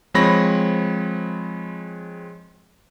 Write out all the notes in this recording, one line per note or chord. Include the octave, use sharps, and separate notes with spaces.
F3 G#3 C4 C#5 B5 A#6